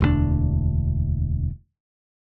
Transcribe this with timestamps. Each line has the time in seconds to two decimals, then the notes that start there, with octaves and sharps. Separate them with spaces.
0.01 E1 D2 G3 D4